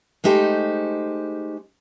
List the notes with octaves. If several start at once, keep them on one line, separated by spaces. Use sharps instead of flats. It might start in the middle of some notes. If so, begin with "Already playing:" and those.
G#3 A3 D#4 G4 C5